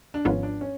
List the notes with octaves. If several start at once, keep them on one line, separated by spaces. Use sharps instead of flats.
D4
G#1 G#2 F3 B3 C#4 F4
D4
C#4